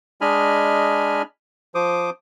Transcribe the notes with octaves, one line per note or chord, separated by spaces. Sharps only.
G#3 D4 D#5 G#5 B5 F6
F3 C5 D6 D#6